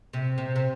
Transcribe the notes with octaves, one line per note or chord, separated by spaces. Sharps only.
C3
C3
C3